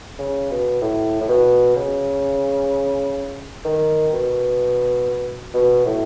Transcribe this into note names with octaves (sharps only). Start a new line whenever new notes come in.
C#3
B2
A2
A2
B2
C#3
D#3
B2
B2
A2